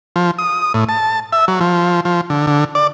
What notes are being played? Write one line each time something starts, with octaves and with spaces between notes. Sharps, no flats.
F3
D#6
A2
A5
E5
F#3
F3
F3
D3
D3
D5